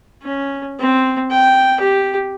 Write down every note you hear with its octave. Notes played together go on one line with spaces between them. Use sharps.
C#4
C4
G5
G4